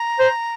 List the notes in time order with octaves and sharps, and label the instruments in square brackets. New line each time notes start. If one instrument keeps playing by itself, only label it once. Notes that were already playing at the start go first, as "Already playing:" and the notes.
Already playing: [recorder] A#5
[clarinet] C5